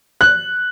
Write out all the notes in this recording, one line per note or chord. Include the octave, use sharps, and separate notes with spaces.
F#6